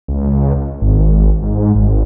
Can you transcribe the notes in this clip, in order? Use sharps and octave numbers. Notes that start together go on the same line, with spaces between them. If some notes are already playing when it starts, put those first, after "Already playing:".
C#2
G#1
G#2
G#1